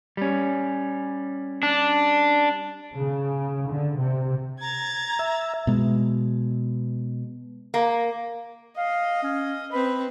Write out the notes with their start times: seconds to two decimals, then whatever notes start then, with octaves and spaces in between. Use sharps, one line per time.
0.17 G3 C#4
1.63 D4
2.96 C#3
3.69 D3
3.99 C3
4.61 A#5 G#6 A6
5.19 E5
5.67 B2 G#3
7.74 A#3
8.77 D#5 F5
9.23 C#4
9.72 C4 B4 B5